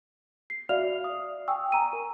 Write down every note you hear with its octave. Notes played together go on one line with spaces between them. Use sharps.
C7
F#4 D5 E5 F5 F6 F7
D#6
G5 G#5 C#6 D#6 E6
G#5 A#5 D#7
A#4